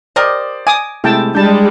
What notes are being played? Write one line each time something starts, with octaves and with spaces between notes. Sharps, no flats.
G4 A#4 C5 D5 D#5
G#5 D6 D#6
C3 G#3 A3 E4 G5 A5
G3 G#3 D4 A5 G6